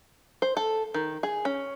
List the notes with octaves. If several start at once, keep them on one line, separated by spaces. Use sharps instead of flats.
C5
A4
D#3
G#4
C#4